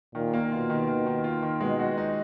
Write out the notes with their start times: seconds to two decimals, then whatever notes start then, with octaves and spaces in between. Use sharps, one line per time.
0.15 A#2 D#3
0.34 A#3
0.51 B2 F4
0.70 D#3
0.88 D#3
1.06 D#3
1.24 F4
1.43 D#3
1.61 B2 G#3
1.79 F#4
1.98 D#4